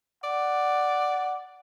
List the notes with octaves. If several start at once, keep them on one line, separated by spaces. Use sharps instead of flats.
D5 F#5